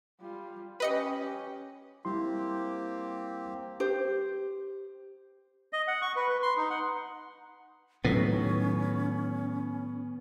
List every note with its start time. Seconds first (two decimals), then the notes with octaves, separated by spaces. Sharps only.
0.20 G3 F4
0.80 C#4 G4 B4 D#5 C#7
2.05 G3 A#3 C4 E4 G4 C6
3.80 G4 C5
5.73 D#5
5.88 F#5
6.02 C#6
6.16 B4
6.29 B4
6.42 C6
6.57 D#4
6.70 F#5
8.05 A2 D#3 F#3 B3 C#4